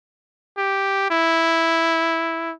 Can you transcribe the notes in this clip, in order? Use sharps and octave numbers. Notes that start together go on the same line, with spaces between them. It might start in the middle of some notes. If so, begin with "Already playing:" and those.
G4
E4